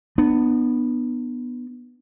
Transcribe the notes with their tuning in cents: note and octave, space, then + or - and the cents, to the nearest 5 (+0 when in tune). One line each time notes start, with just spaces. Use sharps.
B3 -5 D4 +40